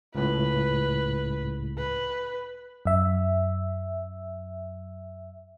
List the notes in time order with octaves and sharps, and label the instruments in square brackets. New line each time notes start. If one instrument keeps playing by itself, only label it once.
[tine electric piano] C#2 A2 [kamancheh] B4
[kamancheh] B4
[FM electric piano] F#2 E5